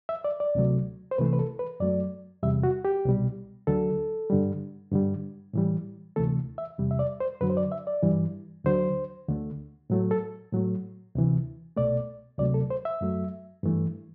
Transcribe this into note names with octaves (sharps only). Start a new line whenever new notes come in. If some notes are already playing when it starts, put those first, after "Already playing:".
E5
D5
D5
D2 C3 F#3 A3
C5
C2 C3 E3 A3 B4
B4
A4
B4
F#2 F#3 A3 D5
E2 C3 G3 E5
F#4
G4
C2 B2 G3
D2 D3 F#3 A4
G2 D3 G3
G2 D3 G3
A2 E3 G3
D2 C3 E3 A3 A4
E5
E2 C3 G3
E5
D5
C5
F#2 D3 F#3 B4
C5
D5
E5
D5
G2 E3 G3
D2 D3 F#3 C5
D2 D3 A3
A2 F#3 A3
A4
A2 F#3 A3
D2 C3 E3
C2 B2 A3 D5
D2 C3 F#3 A3 D5
A4
C5
E5
F#2 F#3 A3
G2 E3 A3